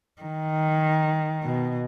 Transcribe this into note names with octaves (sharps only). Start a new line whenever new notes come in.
D#3
B2